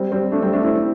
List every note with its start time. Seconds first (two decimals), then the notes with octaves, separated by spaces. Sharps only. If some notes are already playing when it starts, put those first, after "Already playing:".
Already playing: G3 C4
0.12 G3 C4
0.32 A3 D4
0.42 G3 C4
0.53 A3 D4
0.63 C4 E4